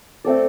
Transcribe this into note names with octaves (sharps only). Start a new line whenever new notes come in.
A3 C4 A4 D5